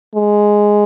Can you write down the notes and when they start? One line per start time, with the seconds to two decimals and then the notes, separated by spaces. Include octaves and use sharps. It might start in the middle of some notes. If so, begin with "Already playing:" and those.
0.15 G#3